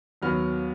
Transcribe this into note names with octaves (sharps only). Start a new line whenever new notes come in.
D#2 D#3 F#3 B3 F6